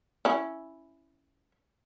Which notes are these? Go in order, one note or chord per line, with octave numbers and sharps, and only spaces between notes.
C#4 E4